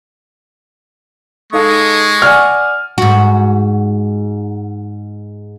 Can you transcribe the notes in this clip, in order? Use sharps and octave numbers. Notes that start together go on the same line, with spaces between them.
G#3 D#4 A4 F5 C#6 D#6
D5 F#5 G#5 F6
G#2 F#4